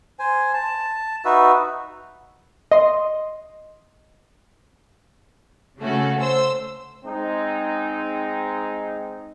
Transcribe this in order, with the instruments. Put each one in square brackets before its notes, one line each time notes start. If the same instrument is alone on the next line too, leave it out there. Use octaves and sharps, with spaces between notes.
[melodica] C5 G#5
A5
D#4 F#4 B4 E5
[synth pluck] D#5 C6
[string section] C#3 A3 C#4 F#4 A4
C5 E6
[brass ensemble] G#3 C4 D#4